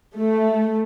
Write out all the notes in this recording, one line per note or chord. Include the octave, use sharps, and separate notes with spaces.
A3